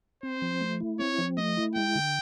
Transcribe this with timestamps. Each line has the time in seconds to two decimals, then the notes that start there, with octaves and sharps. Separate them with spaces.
0.23 C4 C5
0.42 F3
0.61 A3
0.80 E4
0.99 C4 C#5
1.18 F3
1.37 A3 D#5
1.57 E4
1.76 G#3 G5
1.95 D3